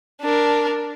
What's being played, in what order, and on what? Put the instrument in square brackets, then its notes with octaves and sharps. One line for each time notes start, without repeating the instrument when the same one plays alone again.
[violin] D4 A#4